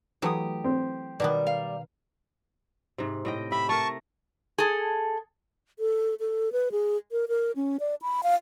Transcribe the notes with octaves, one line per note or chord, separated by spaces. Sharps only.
E3 F#3 A3 G4 D#6
C4
B2 D#3 G3 B3 A#4
F5
G#2 C3
A2 D#5 G5
G4 E5 B5
A3 A#4 A5 C#6
G#4 A4
A4
A4
B4
G#4
A#4
A#4
C#4
D5
B5
F5